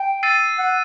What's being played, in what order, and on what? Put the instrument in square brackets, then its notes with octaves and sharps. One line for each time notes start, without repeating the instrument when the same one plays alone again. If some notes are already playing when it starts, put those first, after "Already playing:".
Already playing: [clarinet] G5
[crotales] E6 A6 C7 D#7
[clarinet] F#5